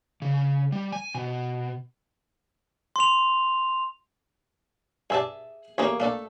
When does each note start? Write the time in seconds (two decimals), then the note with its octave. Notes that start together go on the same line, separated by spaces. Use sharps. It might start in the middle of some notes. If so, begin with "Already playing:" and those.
0.22 C#3
0.72 G3
0.92 G#5
1.15 B2
2.96 C6 F7
5.10 G2 G#4 D5 E5 A5
5.78 A1 E2 A2 A#3 G#4 C#5
6.00 A3 A#3 D4 A4